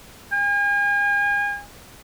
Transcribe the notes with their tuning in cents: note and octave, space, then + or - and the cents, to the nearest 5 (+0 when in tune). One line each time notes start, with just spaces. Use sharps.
G#5 -40